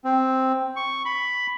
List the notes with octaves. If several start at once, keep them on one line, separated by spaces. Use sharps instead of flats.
C4
C#6
B5